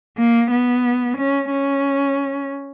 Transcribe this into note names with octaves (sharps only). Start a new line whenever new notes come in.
A#3
B3
C#4
C#4